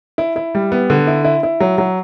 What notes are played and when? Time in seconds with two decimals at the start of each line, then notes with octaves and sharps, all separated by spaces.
0.18 E4
0.36 E4
0.55 G3
0.72 B3
0.90 D3
1.07 E4
1.24 E4
1.43 E4
1.60 F#3
1.78 F#3